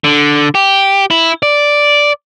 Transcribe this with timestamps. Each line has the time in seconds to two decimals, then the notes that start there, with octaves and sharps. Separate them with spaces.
0.04 D3
0.55 G4
1.11 E4
1.43 D5